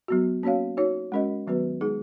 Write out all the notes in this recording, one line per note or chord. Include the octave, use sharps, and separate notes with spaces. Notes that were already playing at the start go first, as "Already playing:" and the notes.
F#3 B3 F#4
A#3 C#4 F#4 C#5 F5
D#4 F#4 C#5
G#3 C#4 F#4 A#4 D#5
D#3 F#3 B3 F#4 B4
G#3 D#4 G#4